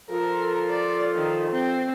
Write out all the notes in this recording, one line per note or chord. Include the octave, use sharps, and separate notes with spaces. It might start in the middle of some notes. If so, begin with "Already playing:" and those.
F3 F4 A4 A#4
D5
D#3
C4